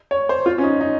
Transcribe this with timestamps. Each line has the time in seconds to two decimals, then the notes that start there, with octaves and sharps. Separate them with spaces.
0.11 C#5
0.29 C5
0.46 F4
0.58 C#4
0.63 D#4
0.81 D#4